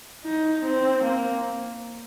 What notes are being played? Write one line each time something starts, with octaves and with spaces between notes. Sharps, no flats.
D#4
C4
A#3